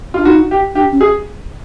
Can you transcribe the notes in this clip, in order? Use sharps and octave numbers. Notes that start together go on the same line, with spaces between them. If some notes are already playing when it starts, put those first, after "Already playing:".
D4 F4
D#4 F#4
G4
D4 G4
C#4
G#4